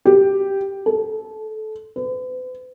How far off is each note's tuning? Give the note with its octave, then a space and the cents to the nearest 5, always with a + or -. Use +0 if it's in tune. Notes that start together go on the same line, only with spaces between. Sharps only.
G4 +0
A4 -20
B4 +45